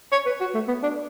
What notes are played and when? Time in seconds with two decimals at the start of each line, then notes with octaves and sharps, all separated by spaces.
0.12 C#5
0.26 B4
0.41 F#4
0.54 A3
0.68 B3
0.83 D4